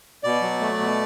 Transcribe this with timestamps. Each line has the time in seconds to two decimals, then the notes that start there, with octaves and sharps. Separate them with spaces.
0.24 B2 D5
0.42 F#3
0.61 A3
0.79 B2